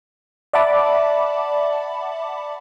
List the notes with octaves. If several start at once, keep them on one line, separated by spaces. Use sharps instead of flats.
D5 E5 F#5 A5 B5 D6